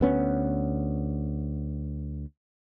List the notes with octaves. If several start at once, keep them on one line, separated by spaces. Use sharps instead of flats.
D2 B3 C#4